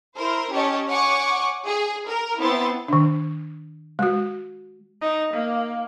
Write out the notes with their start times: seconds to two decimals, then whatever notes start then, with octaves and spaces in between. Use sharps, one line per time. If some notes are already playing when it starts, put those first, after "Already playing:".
0.16 E4 A#4 C5
0.51 C#4 G4 C#5 D#5 A5
0.87 C#5 F#5 G#5 C#6 D6
1.66 G#4
2.07 A#4
2.40 B3 C4 E4 A5 C6 A6
2.88 D#3 D4
3.99 G#3 F#4
5.02 D#4
5.34 A#3